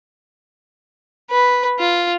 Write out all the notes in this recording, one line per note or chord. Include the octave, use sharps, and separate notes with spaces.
B4
F4